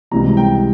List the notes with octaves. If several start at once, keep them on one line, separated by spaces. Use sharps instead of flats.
C#2 C3 E3 G3 A#5
G5